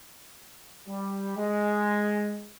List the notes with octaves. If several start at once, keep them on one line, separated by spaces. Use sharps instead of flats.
G3
G#3